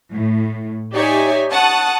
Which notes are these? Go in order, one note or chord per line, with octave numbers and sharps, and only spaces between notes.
A2
D#4 G4 C#5 D5 E5 G#5
F#5 A5 C#6 D#6 F#6